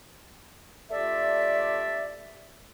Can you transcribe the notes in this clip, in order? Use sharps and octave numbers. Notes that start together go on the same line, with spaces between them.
A3 D4 F4 G4 D5 E5